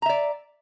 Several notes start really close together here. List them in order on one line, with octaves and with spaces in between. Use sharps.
A#5 E5 D5